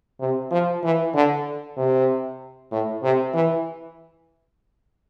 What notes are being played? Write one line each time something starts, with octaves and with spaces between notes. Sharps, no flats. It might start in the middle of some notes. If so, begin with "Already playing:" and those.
C3
F3
E3
D3
C3
A2
C3
E3